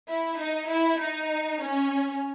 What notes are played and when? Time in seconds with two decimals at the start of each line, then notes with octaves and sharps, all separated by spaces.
0.08 E4
0.38 D#4
0.69 E4
1.00 D#4
1.61 C#4